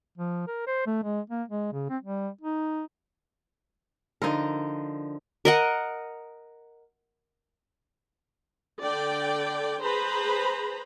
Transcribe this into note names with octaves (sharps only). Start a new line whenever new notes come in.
F3
A#4
C5
A3
G#3
A#3
G#3
C#3
C4
G3
D#4
D3 F3 D#4 A#4
A#4 D#5 F#5
D3 D5 G5
G#4 B4 C5 A#5 B5